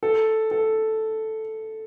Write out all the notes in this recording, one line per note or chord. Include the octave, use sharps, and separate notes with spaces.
A4
A4